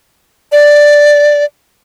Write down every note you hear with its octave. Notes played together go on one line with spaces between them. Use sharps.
D5